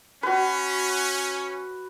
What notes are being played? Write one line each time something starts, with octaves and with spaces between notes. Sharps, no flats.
C#4 F#4 B4